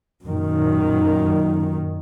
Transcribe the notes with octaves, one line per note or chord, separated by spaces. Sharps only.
F#2 A#2 D#3